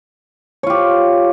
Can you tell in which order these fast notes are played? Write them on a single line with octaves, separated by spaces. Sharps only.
C#5 F4 G4